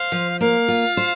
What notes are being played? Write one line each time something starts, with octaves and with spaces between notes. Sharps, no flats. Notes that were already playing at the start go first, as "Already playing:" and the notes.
Already playing: C5 F5
F3
A#3 F5
F4
C5